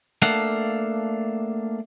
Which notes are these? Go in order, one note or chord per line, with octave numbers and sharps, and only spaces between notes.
A3 A#3 D4 A4 F5 F#5